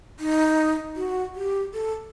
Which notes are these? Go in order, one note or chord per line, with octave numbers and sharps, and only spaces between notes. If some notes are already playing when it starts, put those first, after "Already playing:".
D#4
F#4
G4
A4